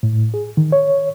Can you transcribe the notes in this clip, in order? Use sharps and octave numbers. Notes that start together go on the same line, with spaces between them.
A2
G#4
D#3
C#5